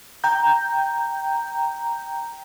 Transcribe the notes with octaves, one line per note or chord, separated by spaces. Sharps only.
G5 A#5 G6